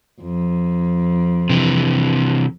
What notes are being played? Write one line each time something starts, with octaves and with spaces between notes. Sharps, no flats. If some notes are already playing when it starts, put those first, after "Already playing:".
F2
C3 E3